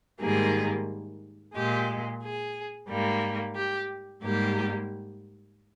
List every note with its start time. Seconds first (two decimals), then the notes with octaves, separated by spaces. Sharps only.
0.21 G#2 D#3 G3 A#3 G#4
1.54 A#2 G#3 G4
2.22 G#4
2.89 G#2 G3 A#3
3.56 G4
4.23 G#2 G3 A#3 G4